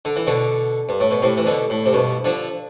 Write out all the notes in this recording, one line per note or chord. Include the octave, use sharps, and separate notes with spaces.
D3
E3
B2 D3
G2
A2
B2
A2 C3
E3
B2 D3
A2
C3
G2 B2
D3 F3